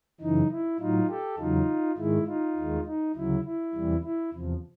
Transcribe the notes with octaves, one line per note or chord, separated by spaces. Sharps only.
F#2 C#3 E3 D#4
E4
A2 F#3 D#4 F4
G4 A4
E2 C#3 F#3 D#4 F4
G#2 D#3 G#3 E4
D#4 F4
D#2 D#3 G#3
D#4
D2 C#3 F#3 E4
E4
E2 C3 E3 G3
E4
E2 C3 F3